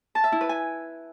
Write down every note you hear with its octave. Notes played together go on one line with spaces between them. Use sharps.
A5
E5
E4
B4
G#5